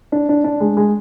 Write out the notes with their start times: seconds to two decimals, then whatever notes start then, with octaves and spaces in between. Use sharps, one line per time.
0.12 D4
0.29 D4
0.44 D4
0.60 G#3
0.77 G#3